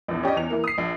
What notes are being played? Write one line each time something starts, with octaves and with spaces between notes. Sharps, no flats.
A#1 E2
C#4 G4 D5 D#5
E2 F7
E3 A#3
D#6 C7
A#1